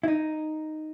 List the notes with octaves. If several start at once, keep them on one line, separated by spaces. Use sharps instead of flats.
E4
D#4